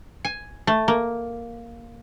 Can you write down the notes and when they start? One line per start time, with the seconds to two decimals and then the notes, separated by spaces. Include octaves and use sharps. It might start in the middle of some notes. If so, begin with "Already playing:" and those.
0.25 G#5
0.67 A3
0.88 A#3